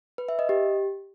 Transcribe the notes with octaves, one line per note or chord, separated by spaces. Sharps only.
B4
E5
D#5
G4